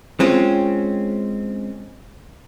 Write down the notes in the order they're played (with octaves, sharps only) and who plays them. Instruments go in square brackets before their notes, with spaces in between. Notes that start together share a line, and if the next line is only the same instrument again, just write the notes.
[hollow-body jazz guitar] G#3 C4 C#4 F4